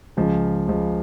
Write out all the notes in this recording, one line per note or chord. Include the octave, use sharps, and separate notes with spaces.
C#2 C#3 F3
C#2 C#3 F3